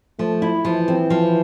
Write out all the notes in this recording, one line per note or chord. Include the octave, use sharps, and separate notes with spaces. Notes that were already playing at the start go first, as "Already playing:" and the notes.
F3 A3
E4
E3 F3
C4
F3